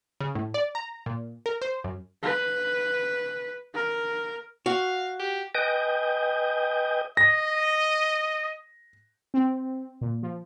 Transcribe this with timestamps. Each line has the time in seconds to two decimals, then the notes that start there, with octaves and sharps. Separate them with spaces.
0.21 C#3
0.35 A2
0.54 D5
0.75 A#5
1.06 A#2
1.46 A#4
1.62 C5
1.84 F#2
2.23 B4
3.74 A#4
4.66 F#4 F5
5.19 G4
5.55 B4 D#5 G5 G#5 D#6 G6
7.17 D#5 A#6
9.34 C4
10.01 A#2
10.23 F3